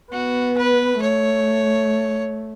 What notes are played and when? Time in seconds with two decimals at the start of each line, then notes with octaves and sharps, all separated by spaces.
0.12 B3 F#4
0.57 B4
1.02 A3 C#5